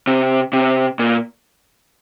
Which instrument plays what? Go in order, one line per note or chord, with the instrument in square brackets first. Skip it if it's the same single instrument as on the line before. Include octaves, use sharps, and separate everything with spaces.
[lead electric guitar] C3
C3
A#2